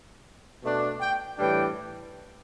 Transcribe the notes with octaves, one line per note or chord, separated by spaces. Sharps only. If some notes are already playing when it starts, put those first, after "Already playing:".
B2 A3 D4
G5
A2 E3 G3 D4 G5